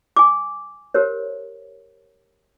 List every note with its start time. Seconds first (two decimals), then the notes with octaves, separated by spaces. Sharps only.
0.16 G#5 D6
0.94 G4 A#4 C5 C#5